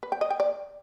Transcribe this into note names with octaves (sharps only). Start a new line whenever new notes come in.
B4
G5
D#5
G5
D5